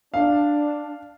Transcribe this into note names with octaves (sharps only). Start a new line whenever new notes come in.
D4 F5